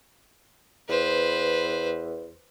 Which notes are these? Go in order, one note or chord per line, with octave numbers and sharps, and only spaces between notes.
E2 B4 C5